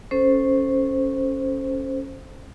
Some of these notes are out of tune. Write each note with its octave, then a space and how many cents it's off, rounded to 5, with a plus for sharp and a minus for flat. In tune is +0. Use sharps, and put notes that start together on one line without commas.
C#4 -10 A4 +0 C5 +0